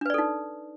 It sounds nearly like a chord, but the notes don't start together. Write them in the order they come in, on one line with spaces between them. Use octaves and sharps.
D4 B4 D5 A4 D#4